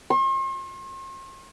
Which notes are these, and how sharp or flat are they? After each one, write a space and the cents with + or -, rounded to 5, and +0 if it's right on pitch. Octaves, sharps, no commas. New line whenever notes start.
C6 +45